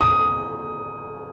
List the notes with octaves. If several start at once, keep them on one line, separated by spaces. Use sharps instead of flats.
D#6